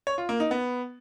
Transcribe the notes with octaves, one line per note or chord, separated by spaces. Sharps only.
C#5
F4
A#3
D#4
B3